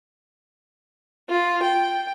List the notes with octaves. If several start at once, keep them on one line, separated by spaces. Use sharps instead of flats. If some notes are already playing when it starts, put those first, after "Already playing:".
F4
G5